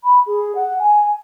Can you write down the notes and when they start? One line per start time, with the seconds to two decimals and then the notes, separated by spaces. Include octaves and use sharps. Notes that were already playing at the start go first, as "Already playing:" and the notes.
0.03 B5
0.26 G#4
0.55 F#5
0.79 G#5